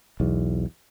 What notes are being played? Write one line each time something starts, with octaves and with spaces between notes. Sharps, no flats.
B1 E2